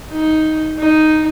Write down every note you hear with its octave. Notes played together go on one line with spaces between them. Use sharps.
D#4
D#4